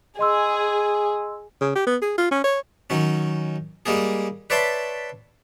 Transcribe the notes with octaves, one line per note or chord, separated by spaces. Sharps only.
G#4 D#5 C6 E6
C#3
G4
B3
G#4
F4
C#4
C#5
D#3 F#3 C#4
G3 G#3 A#3 G#4
B4 C#5 D5 E5 A5 C6